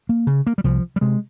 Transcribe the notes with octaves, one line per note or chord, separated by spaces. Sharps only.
A#3
C#3
A#3
G3
C2 F3
G3
C3 G#3